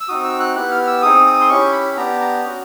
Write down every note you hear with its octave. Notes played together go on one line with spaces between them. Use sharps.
E6
C4 D#4 F#4 D#6
E6
F#6
B3 E4 G4 F#6
F6
F6
E6
C4 D#4 G#4 D#6
D#6
C6
C#4 E4 G4 C#6
B5
B3 D4 G4 A#5
A#5
C#4 F#4